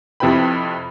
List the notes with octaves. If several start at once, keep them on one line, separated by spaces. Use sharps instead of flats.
F2 C3 E4 B4 G5 B5